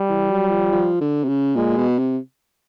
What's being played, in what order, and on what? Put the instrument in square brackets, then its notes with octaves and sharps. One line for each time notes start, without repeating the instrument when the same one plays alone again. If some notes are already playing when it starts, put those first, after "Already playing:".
Already playing: [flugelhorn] G3
[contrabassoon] E3
F#3
F3
F3
D3
C3
C#3
[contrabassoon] A#2 [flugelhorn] G#3
[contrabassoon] B2
C3